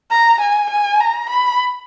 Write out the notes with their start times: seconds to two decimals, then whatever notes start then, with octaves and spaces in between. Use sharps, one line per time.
0.10 A#5
0.41 G#5
0.70 G#5
1.00 A#5
1.30 B5